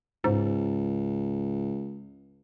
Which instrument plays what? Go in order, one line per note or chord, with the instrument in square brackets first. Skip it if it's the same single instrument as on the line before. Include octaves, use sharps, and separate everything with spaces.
[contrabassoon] C#2 [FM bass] G#2